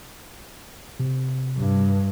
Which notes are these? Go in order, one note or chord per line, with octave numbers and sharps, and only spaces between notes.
C3
G2